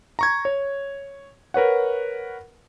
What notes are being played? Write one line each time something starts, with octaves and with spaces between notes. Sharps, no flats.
A#5 C#6 G#6
C#5
A#4 B4 C#5 F#5